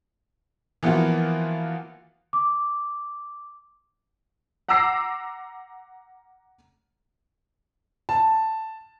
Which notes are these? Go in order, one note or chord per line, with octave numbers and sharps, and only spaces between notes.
E3 F3 A#3 B3 F4 F#4
D6
F#5 A#5 D6 E6 A#6 C7
A5